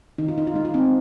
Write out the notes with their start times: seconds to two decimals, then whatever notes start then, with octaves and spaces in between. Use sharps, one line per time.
0.18 D#3 D#4
0.28 F4
0.38 D#4
0.47 F4
0.54 G#3 D#4
0.65 F4
0.74 C4 D#4